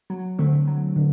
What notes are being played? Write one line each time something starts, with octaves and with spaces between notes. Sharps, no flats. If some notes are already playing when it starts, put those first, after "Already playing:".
F#3
D3 A3 C4
F#3
D3